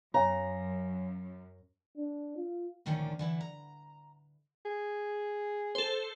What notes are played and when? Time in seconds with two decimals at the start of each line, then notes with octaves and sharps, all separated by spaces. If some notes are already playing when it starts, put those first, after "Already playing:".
0.14 F#2 C#5 F5 G#5 A#5
1.97 D4
2.37 F4
2.86 D2 A#2 D#3 F3 C#4 D4
3.19 D3 E3 E4
3.41 A#5
4.66 G#4
5.75 A4 C5